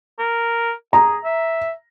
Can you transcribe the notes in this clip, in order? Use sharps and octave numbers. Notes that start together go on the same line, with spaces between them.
A#4
G#4 A#5
E5